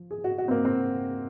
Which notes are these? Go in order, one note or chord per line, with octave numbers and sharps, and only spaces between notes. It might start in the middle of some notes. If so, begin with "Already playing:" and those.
Already playing: F3
G#4
F#4
F#4
C4
A#3
C4